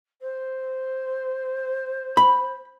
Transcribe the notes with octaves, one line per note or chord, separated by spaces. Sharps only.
C5
B5